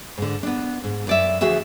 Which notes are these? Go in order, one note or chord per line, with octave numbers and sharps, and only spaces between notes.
G#2 D3
B3 D4
G#2
F#2 D5 E5
D2 F3 F#4 G#4 E5